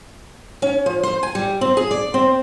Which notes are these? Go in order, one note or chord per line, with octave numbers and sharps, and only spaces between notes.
C#4
F3
C5
G#5
G3
C4
G#4
D5
C4